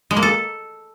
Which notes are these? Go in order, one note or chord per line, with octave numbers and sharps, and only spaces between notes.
G#3
A#3
A4